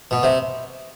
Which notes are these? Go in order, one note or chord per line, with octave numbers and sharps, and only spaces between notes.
B2
C3